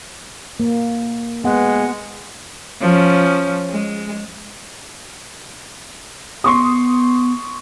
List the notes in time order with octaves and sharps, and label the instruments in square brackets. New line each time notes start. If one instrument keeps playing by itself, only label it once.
[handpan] A#3
[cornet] G#3 [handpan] B3 F#5
[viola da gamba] F3 C#4
G#3
[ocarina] B3 [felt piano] C6 C#6 D#6